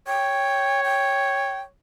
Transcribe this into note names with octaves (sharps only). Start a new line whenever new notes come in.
C#5 G5
G5